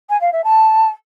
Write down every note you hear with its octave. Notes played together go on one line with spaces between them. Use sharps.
G#5
F5
E5
A5